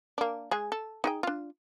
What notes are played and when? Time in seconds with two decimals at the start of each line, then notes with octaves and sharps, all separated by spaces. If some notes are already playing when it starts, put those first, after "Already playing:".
0.18 A#3 D4
0.51 G#3 G#4
0.72 A4
1.04 D#4 G#4 G5
1.23 D4 F4